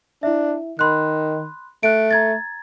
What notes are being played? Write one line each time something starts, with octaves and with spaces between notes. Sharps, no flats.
D4 E4 E5
D#3 B5 C6 F#6
A3 F#6 D7
A#5 G#6 A6